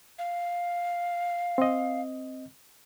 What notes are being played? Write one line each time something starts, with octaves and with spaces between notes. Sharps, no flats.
F5
C4 D#5